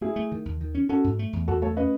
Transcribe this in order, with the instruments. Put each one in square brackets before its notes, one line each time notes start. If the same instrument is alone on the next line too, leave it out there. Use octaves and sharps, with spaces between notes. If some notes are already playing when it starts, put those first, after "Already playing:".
[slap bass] A3 [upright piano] E4 G#4
[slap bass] A3
D#3
D#2
D#3
C#4
[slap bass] C#4 [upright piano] F#4 A4
[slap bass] G#2
A3
E2
[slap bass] E2 [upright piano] F#4 A4
[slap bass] A3 [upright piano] A4 C#5
[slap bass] C#4 [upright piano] B4 D#5